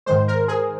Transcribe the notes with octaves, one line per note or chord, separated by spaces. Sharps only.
G#2 D#3 G#3 C5
A#4
G#4